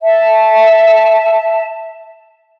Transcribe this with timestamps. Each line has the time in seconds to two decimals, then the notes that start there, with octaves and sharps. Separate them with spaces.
0.02 E5 A5